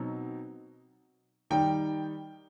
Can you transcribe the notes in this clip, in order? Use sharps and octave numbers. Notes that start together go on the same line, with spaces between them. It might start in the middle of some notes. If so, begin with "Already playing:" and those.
Already playing: B2 F#3 C4 D#4
D#3 G3 D#4 G5